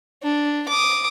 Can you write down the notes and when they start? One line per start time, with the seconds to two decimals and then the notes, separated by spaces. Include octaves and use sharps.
0.23 D4
0.68 D6 D#6